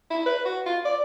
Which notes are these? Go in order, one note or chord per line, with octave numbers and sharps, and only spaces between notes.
E4
B4
F#4
F4
D5